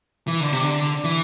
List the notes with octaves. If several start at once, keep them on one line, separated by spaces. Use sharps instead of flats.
E3
D3
C3
D3
E3